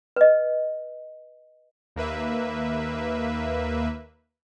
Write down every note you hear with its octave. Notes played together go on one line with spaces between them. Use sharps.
B4 D#5
D#2 A#3 B4 E5